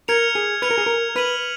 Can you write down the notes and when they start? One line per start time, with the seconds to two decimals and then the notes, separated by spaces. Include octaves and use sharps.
0.08 A#4 F6 G#6 C#7 F7
0.35 G#4
0.62 B4 F6 G#6 C#7 F7
0.71 A#4
0.78 G#4
0.86 A#4
1.16 B4 F6 B6 D#7 F#7